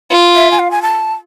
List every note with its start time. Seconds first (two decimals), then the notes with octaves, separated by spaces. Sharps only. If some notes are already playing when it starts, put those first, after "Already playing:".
0.11 F4
0.35 E5
0.51 G#5
0.59 F5
0.71 G#5
0.82 A5